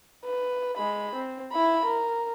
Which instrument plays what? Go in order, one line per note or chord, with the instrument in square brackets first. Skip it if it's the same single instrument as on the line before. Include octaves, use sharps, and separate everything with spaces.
[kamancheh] B4
G#3 B5
C4
E4 B5
A#4